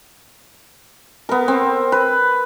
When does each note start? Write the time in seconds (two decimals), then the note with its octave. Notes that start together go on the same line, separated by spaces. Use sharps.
1.29 B3 A#4
1.48 C4
1.92 B4